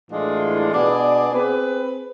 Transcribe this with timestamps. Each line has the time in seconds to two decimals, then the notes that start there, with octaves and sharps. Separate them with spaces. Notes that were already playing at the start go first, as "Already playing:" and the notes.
0.10 A2 E3 G#3 D4 F4
0.71 B2 B3 D4 G#4 D5
1.32 C4 G#4 B4